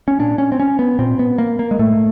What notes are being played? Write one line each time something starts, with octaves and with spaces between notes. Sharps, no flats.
C#4
A#2 D4
C#4
C4
C#4
B3
A#2 C4
B3
A#3
A#3
G#3
A2 A3